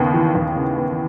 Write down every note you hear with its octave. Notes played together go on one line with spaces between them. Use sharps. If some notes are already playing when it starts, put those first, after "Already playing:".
Already playing: D#2 C#3 B3
E3
D#2
C#3
B3